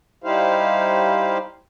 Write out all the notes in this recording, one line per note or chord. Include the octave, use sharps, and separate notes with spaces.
G3 D#4 E4 G4 C5 F5